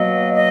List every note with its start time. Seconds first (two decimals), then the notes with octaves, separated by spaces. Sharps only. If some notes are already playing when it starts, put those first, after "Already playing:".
Already playing: B2 F#3 A#3 D#5
0.34 D#5